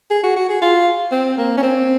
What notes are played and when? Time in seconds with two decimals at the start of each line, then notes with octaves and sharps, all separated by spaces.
0.11 G#4
0.23 F#4
0.36 F#4
0.49 G#4
0.62 F4
1.12 C4
1.38 A#3
1.57 C#4
1.63 C4